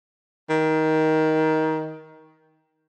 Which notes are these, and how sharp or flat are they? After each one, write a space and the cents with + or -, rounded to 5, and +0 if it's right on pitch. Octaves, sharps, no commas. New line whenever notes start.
D#3 +15